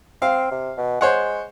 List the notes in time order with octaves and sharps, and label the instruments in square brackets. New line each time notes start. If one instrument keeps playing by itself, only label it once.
[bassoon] C4 [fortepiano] F5
[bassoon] C3
B2
[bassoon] G#3 [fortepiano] C5 C#5 F#5